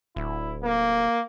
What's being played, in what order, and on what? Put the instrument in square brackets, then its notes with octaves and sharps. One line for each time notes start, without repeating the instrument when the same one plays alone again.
[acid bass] D1 [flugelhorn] E4
[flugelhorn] A#3